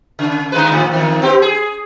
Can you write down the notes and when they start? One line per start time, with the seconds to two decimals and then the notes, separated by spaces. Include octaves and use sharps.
0.19 C#3
0.52 D3 G#3 B4
0.72 A2 F3
0.91 E2 D#3
1.22 B3 C4 G4
1.42 G#4